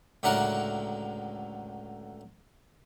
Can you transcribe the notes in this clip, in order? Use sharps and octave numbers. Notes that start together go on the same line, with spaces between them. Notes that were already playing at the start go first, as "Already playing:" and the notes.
C#2 A2 D3 F#3 A#4 F#5